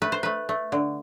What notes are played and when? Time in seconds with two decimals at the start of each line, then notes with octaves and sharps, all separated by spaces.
0.02 A3 B4
0.12 C5
0.23 A3 B4
0.49 A3
0.72 D3